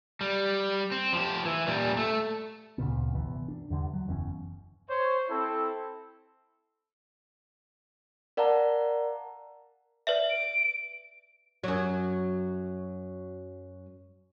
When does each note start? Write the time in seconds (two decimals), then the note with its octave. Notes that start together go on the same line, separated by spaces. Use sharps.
0.21 G3
0.92 C4
1.13 F3 G4
1.45 E3
1.67 A#2 G3
1.97 A3
2.78 D2 A#2 C#3 B3
3.14 G1 C3 E3 B3
3.48 D4
3.70 E2 G2 D3
3.93 F#3
4.08 F#1 E2 C#4
4.89 C5 C#5
5.29 C4 E4 A4
8.37 A#4 D5 F5 F#5 A5 A#5
10.07 B4 D5 E5
10.30 D7
11.64 F#2 F#3